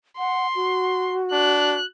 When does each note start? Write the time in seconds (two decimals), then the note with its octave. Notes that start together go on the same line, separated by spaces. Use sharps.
0.18 F#5 C6
0.55 F#4
1.32 D4 F#6